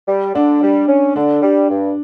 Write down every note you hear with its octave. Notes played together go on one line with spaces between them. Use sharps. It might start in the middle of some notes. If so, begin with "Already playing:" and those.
G3
D3 D4
G3
C#4
D3 D4
G3
G2